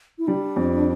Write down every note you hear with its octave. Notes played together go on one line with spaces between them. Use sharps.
E4
G3 D4
F2